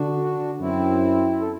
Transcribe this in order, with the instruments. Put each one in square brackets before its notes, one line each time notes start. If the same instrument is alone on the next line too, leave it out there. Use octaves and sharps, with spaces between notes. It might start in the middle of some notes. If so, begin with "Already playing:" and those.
Already playing: [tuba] D3 [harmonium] D4 F#4
[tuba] F#2 [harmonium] C4 E4
[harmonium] A4